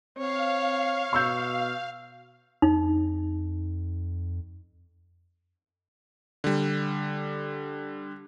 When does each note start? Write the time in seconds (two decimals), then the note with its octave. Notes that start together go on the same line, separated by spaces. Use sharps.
0.18 C4 C#5 F5
1.13 B2 C#6 E6 G6
2.62 F2 D#4
6.44 D3 G3